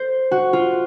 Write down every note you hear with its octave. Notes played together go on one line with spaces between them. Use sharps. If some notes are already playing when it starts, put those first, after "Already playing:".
Already playing: C5
F#4
F4